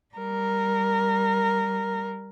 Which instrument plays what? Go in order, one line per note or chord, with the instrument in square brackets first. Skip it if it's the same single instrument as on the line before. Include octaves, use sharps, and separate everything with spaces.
[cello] G3 A#4